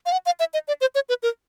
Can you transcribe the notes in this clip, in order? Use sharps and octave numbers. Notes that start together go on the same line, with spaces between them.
F5
F#5
F5
E5
D#5
D5
C5
C#5
B4
A#4